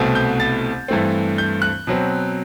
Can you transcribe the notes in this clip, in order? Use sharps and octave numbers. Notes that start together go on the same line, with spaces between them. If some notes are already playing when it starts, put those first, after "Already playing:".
Already playing: C2 B2 A3 C4
G6
A6
G2 E3 A3 C4
G6
F#6
B2 F#3 C4